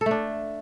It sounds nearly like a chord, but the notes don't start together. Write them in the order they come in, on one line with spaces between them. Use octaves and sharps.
A4 A3 D4